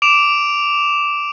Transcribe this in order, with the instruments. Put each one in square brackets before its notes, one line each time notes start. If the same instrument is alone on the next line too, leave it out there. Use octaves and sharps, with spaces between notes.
[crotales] D6 D7 E7 F7